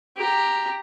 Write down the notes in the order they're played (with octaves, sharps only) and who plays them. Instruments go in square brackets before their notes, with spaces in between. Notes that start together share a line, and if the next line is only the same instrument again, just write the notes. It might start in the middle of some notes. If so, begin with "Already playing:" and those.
[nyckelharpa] G4 A#5